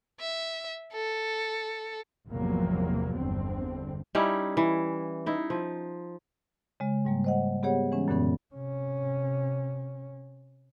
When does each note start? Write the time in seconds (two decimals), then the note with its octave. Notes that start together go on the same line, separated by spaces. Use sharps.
0.20 E5
0.93 A4
2.28 G#1 E2 C3 F3 F#3 A#3
3.15 G1 E2 D3 C4
4.15 G3 C#4 D#4 E4
4.57 E3
5.26 D#4 E4
5.50 F3
6.80 C#3 G#3
7.05 G#2 G3 A#3
7.24 C5 D#5 F#5
7.63 B3 G4 G#4 C#5 F#5
7.92 E3 G#3 C#4
8.08 F#2 A#2 D3 E3 B3 C#4
8.54 C3 C#4